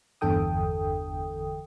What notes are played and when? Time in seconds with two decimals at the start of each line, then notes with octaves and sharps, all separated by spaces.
0.21 G1 E2 D3 A4 G5 D#6